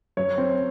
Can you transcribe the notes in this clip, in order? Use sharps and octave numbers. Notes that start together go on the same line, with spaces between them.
F#2 C#5
C4